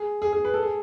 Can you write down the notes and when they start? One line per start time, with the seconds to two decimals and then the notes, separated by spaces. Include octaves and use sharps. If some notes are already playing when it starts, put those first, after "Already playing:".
Already playing: G#4
0.22 G#4
0.33 G#4
0.45 B4
0.54 A4
0.63 G#4